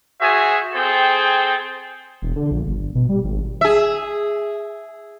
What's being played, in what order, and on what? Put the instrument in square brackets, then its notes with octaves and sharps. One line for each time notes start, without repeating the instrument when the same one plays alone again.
[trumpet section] F#4 G#4 C5 E5 G#5
C4 G#4 A4 C5 G5
[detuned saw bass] E1
D3
A#1
G1
G1
B2
G3
G#1
[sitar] G#4 E5